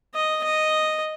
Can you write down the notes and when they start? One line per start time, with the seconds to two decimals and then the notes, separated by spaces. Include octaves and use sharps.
0.15 D#5
0.44 D#5